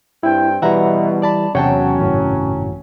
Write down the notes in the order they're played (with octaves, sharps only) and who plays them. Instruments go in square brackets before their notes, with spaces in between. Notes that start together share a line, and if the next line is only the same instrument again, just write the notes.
[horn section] G2 C4 G5 [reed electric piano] E4
[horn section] B2 [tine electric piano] E3 G3 E4 [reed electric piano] E5 F#5 A#5
[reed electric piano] D5 A5 B5
[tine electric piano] E2 C#5 F#5 [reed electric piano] C3 G5 A5 [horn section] F#3 C#4
[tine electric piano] G#1 F#2 A2